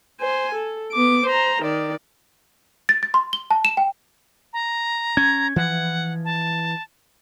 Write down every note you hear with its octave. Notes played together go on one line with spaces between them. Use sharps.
C5 G#5
A4
B3 D6
C5 A#5
D#3 D5
A6
A6
C6
G7
A5
E7
G5
A#5
C#4 G#6
E3 F3 F#5
A5